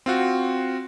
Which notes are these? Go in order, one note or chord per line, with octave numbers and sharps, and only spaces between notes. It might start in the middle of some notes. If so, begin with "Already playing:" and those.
C4 F4 F#4